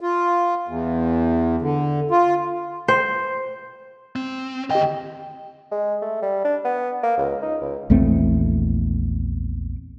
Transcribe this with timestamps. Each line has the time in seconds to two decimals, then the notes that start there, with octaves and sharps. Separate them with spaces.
0.01 F4
0.68 E2
1.61 D3
2.11 F4
2.88 C5
4.16 C4
4.71 D2 G4 D#5 G5
5.72 G#3
6.02 A3
6.22 G3
6.45 D4
6.65 B3
7.03 A#3
7.18 C#2
7.43 D#4
7.62 C#2
7.90 A#1 E2 A3 C4